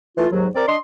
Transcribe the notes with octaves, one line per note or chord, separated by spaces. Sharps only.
E3 A3 F4
D#2 G#2 F#3
C4 A#4 D5
D4 D#5 C6